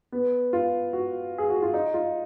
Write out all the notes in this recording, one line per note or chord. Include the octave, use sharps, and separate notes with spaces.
B3
F4
F#4
G#4
F#4
F4
D#4
F4